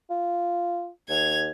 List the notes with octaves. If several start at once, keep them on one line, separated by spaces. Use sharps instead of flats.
F4
D#2 G#6 F7